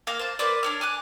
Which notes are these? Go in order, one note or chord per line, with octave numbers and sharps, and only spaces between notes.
A#3 F5 A#5
C5 A5
A#3 B4 C5 D5
D4 C#5 F6
G#5 D6 F#6